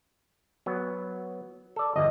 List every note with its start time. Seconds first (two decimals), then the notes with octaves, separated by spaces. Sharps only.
0.66 F#3 B3
1.76 A4 D5
1.96 G1 E2 D#5